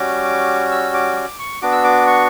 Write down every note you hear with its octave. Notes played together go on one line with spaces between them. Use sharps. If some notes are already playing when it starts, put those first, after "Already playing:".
Already playing: G3 C#4 F#4 D6
E6
D6
D6
C#6
B3 D4 F#4 D6
E6
D6
C#6